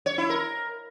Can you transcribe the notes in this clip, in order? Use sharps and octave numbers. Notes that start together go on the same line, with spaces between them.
C#5
E4
A#4